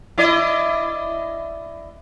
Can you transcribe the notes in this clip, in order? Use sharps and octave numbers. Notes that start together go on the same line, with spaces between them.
E4 D5 D#5